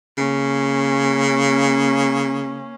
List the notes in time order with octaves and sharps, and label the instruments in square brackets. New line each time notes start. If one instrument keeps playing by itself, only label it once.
[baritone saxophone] C#3 [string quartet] A#3 C#4